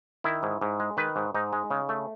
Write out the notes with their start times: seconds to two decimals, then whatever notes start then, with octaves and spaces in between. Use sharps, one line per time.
0.24 D#3 E4
0.43 G#2
0.61 G#2
0.80 G#3
0.97 D#3 B4
1.16 G#2
1.34 G#2 D#4
1.53 G#3
1.71 C#3
1.89 A3